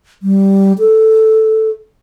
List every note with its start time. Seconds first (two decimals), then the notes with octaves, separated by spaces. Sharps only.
0.23 G3
0.79 A4